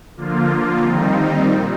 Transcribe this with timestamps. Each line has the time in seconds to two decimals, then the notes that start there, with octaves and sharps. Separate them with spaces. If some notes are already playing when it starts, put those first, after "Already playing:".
0.16 D3 F3 A#3 F4
0.81 D#3 G3 C4 D#4
1.46 A#2